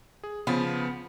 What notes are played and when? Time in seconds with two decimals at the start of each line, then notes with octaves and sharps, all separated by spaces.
0.23 G#4
0.47 C#3 F3 B3